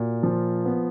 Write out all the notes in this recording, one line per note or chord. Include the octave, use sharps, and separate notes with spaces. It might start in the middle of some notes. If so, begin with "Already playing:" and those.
Already playing: A#2 F#4
F3
B3